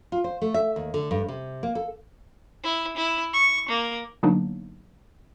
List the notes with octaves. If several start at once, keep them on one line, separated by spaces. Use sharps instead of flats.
F4
C5
A3
E5
D#2
D3
G2
C3
A#3
A4
E4
E4
C#6
A#3
D3 F#3 A#3 B3 D4 D#4